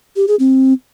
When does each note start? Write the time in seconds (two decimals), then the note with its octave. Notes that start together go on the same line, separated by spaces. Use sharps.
0.16 G4
0.28 G#4
0.40 C4